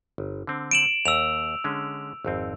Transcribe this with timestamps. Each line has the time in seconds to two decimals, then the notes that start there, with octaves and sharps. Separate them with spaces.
0.18 G1
0.47 D3 C4
0.71 D7 E7 F#7
1.06 D#2 E6 F7
1.64 D3 G#3 C#4
2.25 G#1 F2 C4